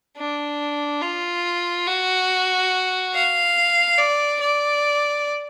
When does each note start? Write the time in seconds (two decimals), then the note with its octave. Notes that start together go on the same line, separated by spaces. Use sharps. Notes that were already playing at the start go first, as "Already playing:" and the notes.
0.17 D4
1.02 F4
1.87 F#4
3.14 F5
3.98 D5
4.41 D5